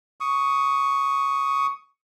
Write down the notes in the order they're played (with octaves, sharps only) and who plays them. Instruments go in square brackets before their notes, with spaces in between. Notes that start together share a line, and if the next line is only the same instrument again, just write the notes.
[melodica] C#6 D#6